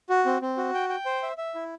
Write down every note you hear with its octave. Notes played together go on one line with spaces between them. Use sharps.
F#4
C4
C4
F#4
G5
G5
C5
E5
E5
E4